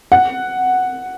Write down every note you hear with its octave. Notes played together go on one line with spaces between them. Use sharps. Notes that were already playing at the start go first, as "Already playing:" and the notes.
F#5